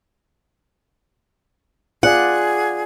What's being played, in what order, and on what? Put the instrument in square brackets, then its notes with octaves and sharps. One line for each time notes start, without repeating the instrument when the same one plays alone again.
[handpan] F4 D5 F5 [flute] G#4 [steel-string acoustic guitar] F#5